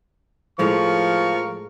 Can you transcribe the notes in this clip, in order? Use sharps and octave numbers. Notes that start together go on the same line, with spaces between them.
A2 F3 G#3 A#4 F5 C#6